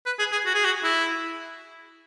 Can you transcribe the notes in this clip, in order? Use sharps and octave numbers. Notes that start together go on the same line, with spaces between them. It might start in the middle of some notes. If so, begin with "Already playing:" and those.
B4
G#4
G#4
F#4
G#4
F#4
E4